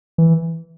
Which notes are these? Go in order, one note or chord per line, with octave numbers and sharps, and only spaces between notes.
E3